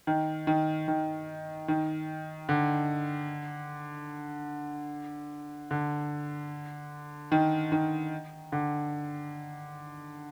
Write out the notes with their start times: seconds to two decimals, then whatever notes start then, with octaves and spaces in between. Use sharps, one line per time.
0.07 D#3
0.47 D#3
0.88 D#3
1.68 D#3
2.49 D3
5.71 D3
7.32 D#3
7.72 D#3
8.52 D3